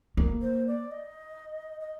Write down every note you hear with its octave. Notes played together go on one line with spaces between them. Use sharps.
A#3
C5
D5
D#5
D#5